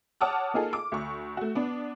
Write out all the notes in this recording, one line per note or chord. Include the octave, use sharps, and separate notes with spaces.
C#5 F#5 A5 D6 D#6 F6
A#3 D#4 F4 G#4 A4
D6
D2 C#6
A3 F#4
B3 D4